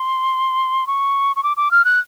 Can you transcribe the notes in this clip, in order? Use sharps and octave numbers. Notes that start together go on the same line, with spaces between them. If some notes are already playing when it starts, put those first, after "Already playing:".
Already playing: C6
C#6
C#6
D6
D6
F6
F#6